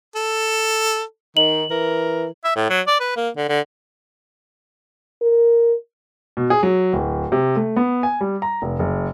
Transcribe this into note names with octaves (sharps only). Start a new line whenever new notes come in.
A4
D#3 D#4 F#7
E3 A#4
E5
A2
F#3
D5
B4
A#3
D3
D3
A#4
B2
G#4
F#3
D1
C3
A3
B3
G#5
G3
A#5
F1
F#1